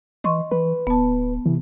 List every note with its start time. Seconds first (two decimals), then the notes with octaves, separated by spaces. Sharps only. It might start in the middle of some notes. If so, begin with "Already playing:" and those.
0.24 E3 D#5 C6 C#6
0.51 E3 B4
0.87 D1 B3 A5
1.46 C3 E3